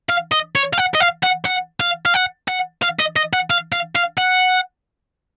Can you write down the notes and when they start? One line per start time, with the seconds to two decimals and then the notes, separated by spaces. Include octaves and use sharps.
0.09 F5
0.32 D#5
0.55 C#5
0.73 F5
0.78 F#5
0.95 D#5
1.00 F5
1.23 F#5
1.46 F#5
1.80 F5
2.06 F5
2.14 F#5
2.48 F#5
2.82 F5
2.99 D#5
3.16 D#5
3.33 F#5
3.50 F5
3.72 F5
3.96 F5
4.18 F#5